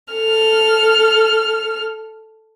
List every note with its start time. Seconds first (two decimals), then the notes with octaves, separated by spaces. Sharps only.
0.14 A4 F6